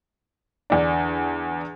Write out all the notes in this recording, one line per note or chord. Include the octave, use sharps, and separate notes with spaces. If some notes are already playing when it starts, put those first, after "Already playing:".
E2 D3 D4